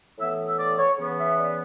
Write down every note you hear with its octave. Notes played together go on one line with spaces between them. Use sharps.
A2 E3 B3 E5
E5
D5
C#5
C#3 E3 B3
E5
D5